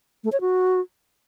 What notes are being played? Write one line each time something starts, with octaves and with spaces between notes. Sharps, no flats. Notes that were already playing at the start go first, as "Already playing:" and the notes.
A3
C#5
F#4